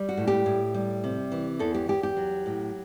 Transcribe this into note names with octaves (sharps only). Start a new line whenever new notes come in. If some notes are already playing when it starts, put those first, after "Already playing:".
Already playing: G3
F#4
A2
G4
A2
G3
C3
E3
E2 A4
G4
E2 G4
G4
F#3
A2